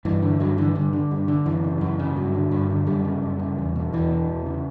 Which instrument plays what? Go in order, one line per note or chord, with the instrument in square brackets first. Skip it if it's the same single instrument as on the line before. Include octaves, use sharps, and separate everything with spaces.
[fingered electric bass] G2 E3
D3
G2 F#3
D3 E3
G2 D3
D3
G2
D3
F#2 E3
C#3
F#2
C#3
G2 F#3
D3
G2
D3
F#2 G3
C#3
F#2
C#3
E2
B2
E2 E3
B2
E2
C#3